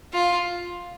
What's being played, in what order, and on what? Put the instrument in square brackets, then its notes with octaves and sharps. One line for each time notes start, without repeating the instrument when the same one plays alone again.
[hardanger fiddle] F4